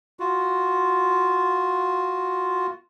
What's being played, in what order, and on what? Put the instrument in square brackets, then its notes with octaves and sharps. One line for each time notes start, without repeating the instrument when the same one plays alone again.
[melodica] F4 F#4